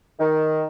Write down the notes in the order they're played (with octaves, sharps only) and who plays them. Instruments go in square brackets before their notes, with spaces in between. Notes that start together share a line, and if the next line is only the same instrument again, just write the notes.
[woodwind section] D#3